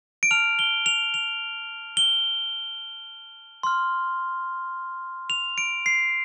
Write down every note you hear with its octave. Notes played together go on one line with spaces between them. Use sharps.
D7
A5 F6 F7
G7
F7
F7
G7
C6 F6
F7
D7
C7